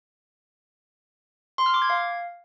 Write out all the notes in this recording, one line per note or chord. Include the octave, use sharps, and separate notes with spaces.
C6
F6
D6
G#6
F5